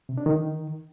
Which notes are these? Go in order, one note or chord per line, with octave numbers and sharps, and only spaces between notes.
C3
D4
D#3